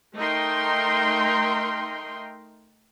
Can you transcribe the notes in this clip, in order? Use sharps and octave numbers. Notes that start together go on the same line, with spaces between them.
A3 D#4 A#4 G5 C6